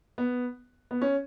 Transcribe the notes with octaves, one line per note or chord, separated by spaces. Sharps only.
B3
B3
C#4